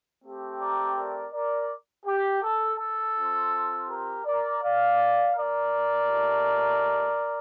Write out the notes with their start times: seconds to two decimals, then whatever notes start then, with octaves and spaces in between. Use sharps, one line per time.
0.24 A3 C4 G4
0.60 A#4 D5
0.97 A#4 D5
1.33 A#4 D5
2.06 G4
2.43 A4
2.79 A4
3.16 C4 F4
3.89 G4 A#4
4.25 A#4 D5
4.62 D5 F5
5.36 A#4 D5
6.08 A3 D#4 G4